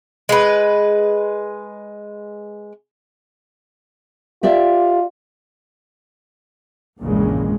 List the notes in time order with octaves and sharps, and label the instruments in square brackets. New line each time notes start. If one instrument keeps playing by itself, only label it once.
[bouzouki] G#3 B4
[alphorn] F4 [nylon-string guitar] G4 D5 E5
[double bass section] A#1 E2 G2 A#2 C#3 G#3